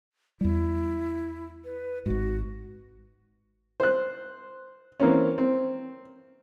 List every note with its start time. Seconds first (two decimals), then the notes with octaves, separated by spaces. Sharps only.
0.41 E2 G3 E4
1.65 B4
2.06 G#1 G#2 F#4
3.80 C5 F#6
5.00 E3 A#3 C4 C#4
5.38 C4